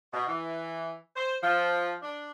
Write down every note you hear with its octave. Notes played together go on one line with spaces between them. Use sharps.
B2
E3
C5
F3
D4